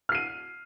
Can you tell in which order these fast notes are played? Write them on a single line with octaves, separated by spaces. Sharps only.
F6 C7 D#7